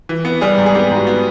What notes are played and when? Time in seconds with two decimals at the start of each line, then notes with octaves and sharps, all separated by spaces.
0.09 E3
0.25 B3
0.41 G3 G#4
0.58 G#2
0.66 G#4
0.75 B3 G4
0.91 G#2 F#4
1.07 B3